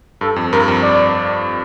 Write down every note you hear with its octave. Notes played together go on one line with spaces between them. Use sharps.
G2 A4
F2
G2 A#4
F2
D5